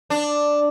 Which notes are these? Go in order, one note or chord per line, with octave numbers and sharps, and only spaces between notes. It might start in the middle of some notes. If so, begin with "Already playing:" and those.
D4